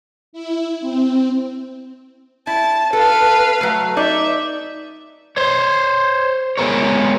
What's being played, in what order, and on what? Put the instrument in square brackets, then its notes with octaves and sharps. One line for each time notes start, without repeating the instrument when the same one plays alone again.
[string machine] E4
C4
[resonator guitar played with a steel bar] E4 [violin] A5
[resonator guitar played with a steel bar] A4 [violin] B4 F5
[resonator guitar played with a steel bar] F#3 A3
[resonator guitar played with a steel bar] D#4 D5 [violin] E5
[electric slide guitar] C5 C#5
G#3 B3 A#4 C#5